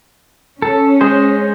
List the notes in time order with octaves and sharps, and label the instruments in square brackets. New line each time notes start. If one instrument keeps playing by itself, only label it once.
[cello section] C#4 [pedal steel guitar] A4
[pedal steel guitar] G#3 G#4 C5